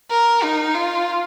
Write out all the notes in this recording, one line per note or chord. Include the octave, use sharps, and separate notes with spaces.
A#4
D#4
F4